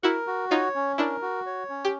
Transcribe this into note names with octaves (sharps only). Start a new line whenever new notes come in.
E4 F#4 A#4
F#4
D#4 F4 C#5
C#4
D4 E4 A#4
F#4
C#5
C#4
G4